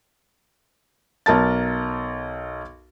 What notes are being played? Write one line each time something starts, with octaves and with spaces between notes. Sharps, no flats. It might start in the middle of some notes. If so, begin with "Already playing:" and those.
B1 A#4 A5 A6